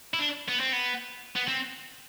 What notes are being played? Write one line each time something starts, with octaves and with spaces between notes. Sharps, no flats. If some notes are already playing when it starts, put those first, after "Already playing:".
E4
D4
B3
C4
B3
B3
C4